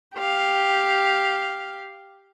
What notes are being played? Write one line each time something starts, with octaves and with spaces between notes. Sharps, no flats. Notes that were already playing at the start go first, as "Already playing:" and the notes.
G4 F5